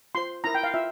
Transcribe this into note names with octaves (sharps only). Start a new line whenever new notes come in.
F4 C5 C6
E4 A#4 A#5
G5
F5
F4 E5